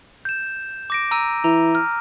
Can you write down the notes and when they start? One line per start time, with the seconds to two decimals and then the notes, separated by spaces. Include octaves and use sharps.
0.25 G6 E7
0.90 D6 A#6 D7
1.11 A#5 E6 D#7
1.44 E3 A#5
1.75 F6